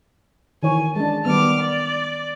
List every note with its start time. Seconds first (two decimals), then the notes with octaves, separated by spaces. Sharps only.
0.63 D#3 E3 C#5 G#5
0.96 G#3 D4 A5
1.26 D#3 G3 B3 D6 F6
1.61 D5